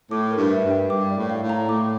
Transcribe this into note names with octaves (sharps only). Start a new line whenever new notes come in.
A2 D6
A#4
G2
E5
G2
G5
G2 D6
D5
A2
F5
A2
A#5
A2 D6